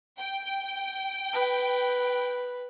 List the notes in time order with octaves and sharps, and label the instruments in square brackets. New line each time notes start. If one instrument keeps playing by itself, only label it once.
[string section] G5
[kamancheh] B4